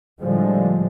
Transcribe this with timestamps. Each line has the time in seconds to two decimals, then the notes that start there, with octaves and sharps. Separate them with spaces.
0.21 A2 D3 F3 G3 G#3